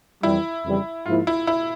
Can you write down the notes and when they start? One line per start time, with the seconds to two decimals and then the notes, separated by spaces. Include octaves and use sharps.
0.23 F2 E3 G3 E4
0.65 F2 C#3 E3 G3
1.06 G#2 F3 A#3 E4 F4
1.27 E4
1.47 E4